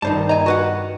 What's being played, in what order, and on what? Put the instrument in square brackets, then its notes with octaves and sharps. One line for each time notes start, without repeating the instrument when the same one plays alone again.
[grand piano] G2 D#3 [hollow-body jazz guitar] D#4 C5 A5
[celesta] D#5 [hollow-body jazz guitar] G#5 A#5
[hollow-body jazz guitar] F#4 B4 F#5